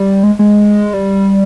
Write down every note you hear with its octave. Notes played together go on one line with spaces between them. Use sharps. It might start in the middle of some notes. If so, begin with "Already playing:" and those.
Already playing: G3
G#3
G#3
G3